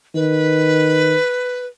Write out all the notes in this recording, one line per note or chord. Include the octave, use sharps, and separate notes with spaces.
D#3 B4